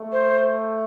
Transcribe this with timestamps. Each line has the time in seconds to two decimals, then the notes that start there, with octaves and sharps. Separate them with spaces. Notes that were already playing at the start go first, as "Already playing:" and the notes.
Already playing: A3
0.12 C5